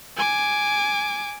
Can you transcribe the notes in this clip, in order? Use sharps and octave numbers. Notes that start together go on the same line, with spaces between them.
G#5 D6